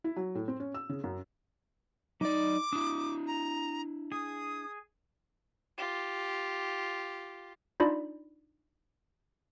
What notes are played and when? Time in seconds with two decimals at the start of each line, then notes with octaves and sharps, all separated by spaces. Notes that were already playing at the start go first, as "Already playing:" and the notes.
0.04 E4
0.17 F#3
0.35 A2
0.48 C4
0.60 C#4
0.74 E6
0.89 C#3
1.04 F#2
2.21 F#3 D#4 D5 D6
2.73 D4 E4 D#6
3.27 A#5
4.12 G#4 D#6
5.78 F4 G4
7.80 D4 D#4 F4 D5 B5